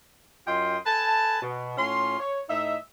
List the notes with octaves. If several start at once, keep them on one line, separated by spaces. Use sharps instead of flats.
F#2 F4 D#5 G5 C6
A4 B4 G#5 A5
B2
A2 C#4 F4 C6
C#5
A2 D#4 D#5 E5